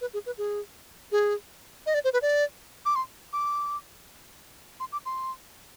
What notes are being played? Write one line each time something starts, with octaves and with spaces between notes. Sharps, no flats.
B4
G#4
B4
G#4
G#4
D#5
D5
C5
B4
D5
D6
C6
D6
C6
D6
C6